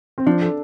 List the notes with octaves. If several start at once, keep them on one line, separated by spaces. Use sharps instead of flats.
C4
F3 D4
A4